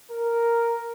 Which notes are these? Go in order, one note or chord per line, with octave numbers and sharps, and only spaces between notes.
A#4